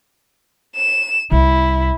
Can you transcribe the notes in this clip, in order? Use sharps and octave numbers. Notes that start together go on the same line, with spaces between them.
E7
C2 E4